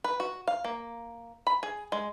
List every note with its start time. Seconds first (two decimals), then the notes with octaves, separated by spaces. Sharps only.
0.04 B4
0.20 F#4
0.47 F5
0.64 A#3
1.47 B5
1.63 G#4
1.92 G#3